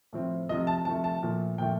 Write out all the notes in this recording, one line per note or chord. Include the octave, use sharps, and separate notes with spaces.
A2 F3 C4
C3 F3 A3 D#5
A5
C3 F3 A3 A5
A5
A#2 F3 A3
A#2 F3 A3 G5